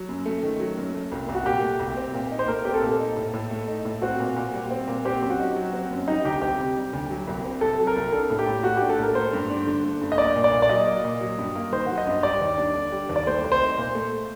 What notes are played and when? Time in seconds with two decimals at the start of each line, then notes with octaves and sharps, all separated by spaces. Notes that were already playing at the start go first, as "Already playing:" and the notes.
Already playing: F#3
0.09 F#2
0.26 A3
0.43 D#3
0.60 F#3
0.77 F#2
0.94 A3
1.12 C2
1.29 C2
1.35 F#4
1.45 A#2 G4
1.63 A3
1.80 C2
1.97 C4
2.14 A#2
2.31 D#4
2.39 C5
2.48 A3 A#4
2.65 C4 G4
2.74 A4
2.82 A#2
3.00 D#4
3.17 A2
3.34 A2
3.51 A3
3.68 D#4
3.85 A2
4.02 C4 F#4
4.20 A#2
4.37 A#2
4.54 G3
4.71 C4
4.88 A#2
5.05 C4 G4
5.22 F#2 G4
5.30 F#4
5.39 D#4
5.56 F#3
5.73 C4
5.91 F#2
6.08 G3 D#4
6.25 D2 G4
6.42 C4 G4
6.59 C3
6.76 G3
6.93 D2
7.10 F#3
7.27 C2
7.44 C4
7.61 C3 A4
7.79 F#3
7.87 A#4
7.96 C2
8.12 D4 A4
8.30 A2
8.39 G4
8.47 A2
8.63 A3 F#4
8.77 D4 G4
8.89 A4
8.99 A2 A#4
9.15 A3 C5
9.33 G2
9.50 D4
9.67 D3
9.84 A3
10.01 G2
10.12 D#5
10.18 A#3 D5
10.36 A#2
10.44 D5
10.53 A#2
10.62 D5
10.70 F#3 D#5
10.87 A#3
11.04 A#2
11.21 F#3
11.38 G2
11.55 A#3
11.72 D#3 C5
11.87 F#3 F#5
11.98 D#5
12.07 G2
12.23 G3 D5
12.41 D#2
12.58 D4
12.75 D3
12.92 G3
13.09 D#2
13.16 D5
13.27 A3 C5
13.44 C2
13.52 C5
13.61 D#4
13.77 A#2
13.95 A3